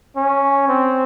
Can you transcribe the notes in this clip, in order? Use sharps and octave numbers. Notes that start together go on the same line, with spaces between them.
C#4
C4